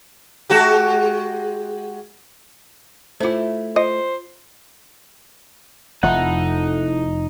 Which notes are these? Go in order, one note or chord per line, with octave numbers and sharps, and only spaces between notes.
G#3 F#4 G4
A3 E4 F4 C5
F4 C5 D#5
F1 F2 F3 D#4 E4 A4 F#5